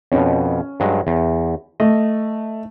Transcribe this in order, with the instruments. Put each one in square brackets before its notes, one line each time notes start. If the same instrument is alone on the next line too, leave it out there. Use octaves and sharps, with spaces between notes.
[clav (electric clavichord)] F2 B2 [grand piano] C#4
[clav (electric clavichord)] G2 F#3 G#3
E2
[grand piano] A3 [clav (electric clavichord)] D#5